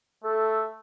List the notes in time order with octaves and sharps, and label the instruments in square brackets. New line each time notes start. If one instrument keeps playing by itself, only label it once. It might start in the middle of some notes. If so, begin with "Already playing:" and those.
[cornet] A3 [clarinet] A4